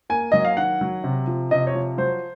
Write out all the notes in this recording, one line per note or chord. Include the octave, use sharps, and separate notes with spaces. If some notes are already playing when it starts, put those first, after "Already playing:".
A#3 G#5
F#3 D#5
F5
D#3 F#5
F#3
C3
F3
C3 D#5
C#5
F3
F#3 C5